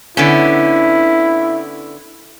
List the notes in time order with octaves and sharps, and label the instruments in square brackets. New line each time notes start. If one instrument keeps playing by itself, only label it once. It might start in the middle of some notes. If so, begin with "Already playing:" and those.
[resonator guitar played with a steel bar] D3 B3 C#4 [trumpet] E4